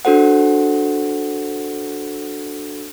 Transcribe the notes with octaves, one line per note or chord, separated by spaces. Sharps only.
D4 F#4 A4 C5 F#5